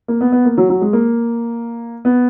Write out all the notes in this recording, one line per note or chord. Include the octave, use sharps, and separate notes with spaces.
A#3
B3
B3
A#3
F#3
F#3
G#3
A#3
B3